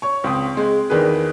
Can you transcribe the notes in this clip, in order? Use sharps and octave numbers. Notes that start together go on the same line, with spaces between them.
C#5 C#6
C#2 C4 D#6
G#3 C4
E2 D#3 D4 G#4 B4